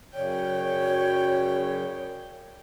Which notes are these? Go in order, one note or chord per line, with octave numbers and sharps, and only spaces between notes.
F#2 C#3 C#5 D5 G5